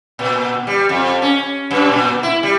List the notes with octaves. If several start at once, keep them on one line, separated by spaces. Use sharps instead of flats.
A#2
G3
F2
C#4
F#2
A#2
E4
G3